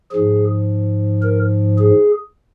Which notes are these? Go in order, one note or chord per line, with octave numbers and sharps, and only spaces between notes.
G#2 F3 G#4
A#4
G#4